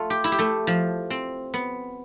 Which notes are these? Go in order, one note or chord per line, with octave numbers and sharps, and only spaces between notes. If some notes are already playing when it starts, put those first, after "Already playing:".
Already playing: A3 F4
G4
E4
G4
A3 A4
F3
C4
B3